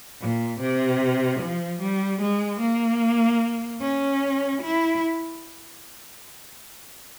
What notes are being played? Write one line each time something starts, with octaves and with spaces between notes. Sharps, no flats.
A#2
C3
F3
G3
G#3
A#3
C#4
E4